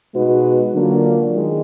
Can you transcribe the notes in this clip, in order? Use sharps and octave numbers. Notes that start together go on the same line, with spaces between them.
B2 G#3 D#4 F#4 B4
D3 F#3 A#3 D4 F4
D#3 G#3